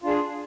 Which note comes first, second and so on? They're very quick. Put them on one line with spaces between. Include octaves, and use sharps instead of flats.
F4 D4 G#4